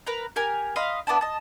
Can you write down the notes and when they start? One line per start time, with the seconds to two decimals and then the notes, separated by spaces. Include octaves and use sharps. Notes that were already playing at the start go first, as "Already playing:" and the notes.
0.07 A#4 B4 A#5
0.36 G4 A#4 G#5
0.76 D#5 F5 B5 C6
1.07 B3 D4 E4 A5
1.21 D#5 A5